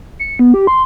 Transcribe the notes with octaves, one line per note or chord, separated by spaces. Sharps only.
C#7
B3
G4
C6